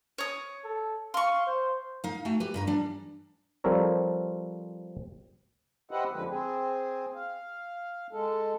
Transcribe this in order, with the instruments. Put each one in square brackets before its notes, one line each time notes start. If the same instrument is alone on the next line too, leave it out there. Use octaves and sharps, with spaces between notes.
[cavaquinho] C#5 D#6
[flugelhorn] A4
[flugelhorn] F5 [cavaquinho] C6 C#6
[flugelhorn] C5
[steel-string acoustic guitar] D#4 F5
A3 F#4 G5 G#5
G4 B4
G2 B4 A#5
E3 G3 D4 D5
[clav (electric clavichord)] F3 G3 C4 A4 A#4 C#5
[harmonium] G4 B4 C5 D#5 E5 F#5
F2 D3 F3 G#3 B4
C4 G#4
F5
G#3 A4